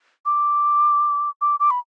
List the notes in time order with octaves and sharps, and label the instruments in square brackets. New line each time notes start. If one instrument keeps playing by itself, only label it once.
[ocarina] D6
D6
D6
B5